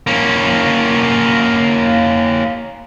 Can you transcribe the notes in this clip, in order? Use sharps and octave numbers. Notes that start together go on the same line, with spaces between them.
A#3 C#4